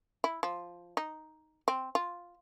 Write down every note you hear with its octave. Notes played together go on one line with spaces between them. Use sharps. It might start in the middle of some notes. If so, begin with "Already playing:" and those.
E4
F3
D#4
C4
F4